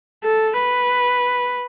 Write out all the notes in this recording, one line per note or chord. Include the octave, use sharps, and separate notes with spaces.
A4
B4